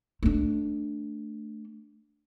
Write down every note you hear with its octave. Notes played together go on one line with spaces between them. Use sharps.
A3 D4